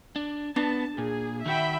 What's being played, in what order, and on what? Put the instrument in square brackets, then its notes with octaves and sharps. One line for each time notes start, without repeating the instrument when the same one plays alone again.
[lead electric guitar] D4
[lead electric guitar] B3 [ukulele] D4 [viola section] A5
[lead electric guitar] A#2 [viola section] G#4
[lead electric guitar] D#3 F#4 [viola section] E5 G5 B5